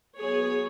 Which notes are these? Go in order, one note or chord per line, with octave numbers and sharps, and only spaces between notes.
F#3 B3 G#4 C#5